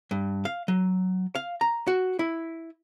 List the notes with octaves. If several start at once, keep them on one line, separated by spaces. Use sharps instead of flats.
G2
F5
F#3
F5
A#5
F#4
E4